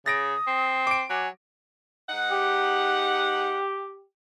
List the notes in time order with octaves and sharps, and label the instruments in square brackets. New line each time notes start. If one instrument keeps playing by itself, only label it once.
[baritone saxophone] C#3 [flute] D#6 [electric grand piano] A6 A#6 D7
[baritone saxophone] C4
[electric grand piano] D6 D7
[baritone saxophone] F#3 [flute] G#5
[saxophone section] G#2 D#4 F#5
[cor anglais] G4